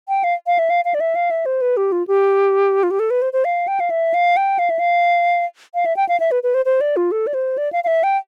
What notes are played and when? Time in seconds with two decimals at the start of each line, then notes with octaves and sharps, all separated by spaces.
0.08 G5
0.24 F5
0.47 F5
0.59 E5
0.70 F5
0.85 F5
0.94 D5
1.00 E5
1.15 F5
1.31 E5
1.46 C5
1.62 B4
1.77 G4
1.92 F4
2.07 G4
2.83 F4
2.91 G4
2.99 A4
3.10 B4
3.22 C5
3.33 C5
3.45 F5
3.68 G5
3.80 F5
3.90 E5
4.14 F5
4.37 G5
4.59 F5
4.70 E5
4.79 F5
5.74 F5
5.86 E5
5.96 G5
6.09 F5
6.20 E5
6.31 B4
6.43 B4
6.54 C5
6.65 C5
6.81 D5
6.96 F4
7.12 A4
7.27 D5
7.34 C5
7.58 D5
7.73 F5
7.84 F5
7.87 E5
8.03 G5